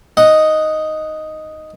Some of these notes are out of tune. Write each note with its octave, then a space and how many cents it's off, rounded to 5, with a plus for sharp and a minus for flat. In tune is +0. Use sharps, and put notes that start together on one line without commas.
D#4 +0 D#5 +0 F#5 +0